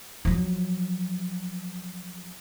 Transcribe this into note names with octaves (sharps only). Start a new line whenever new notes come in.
F3 F#3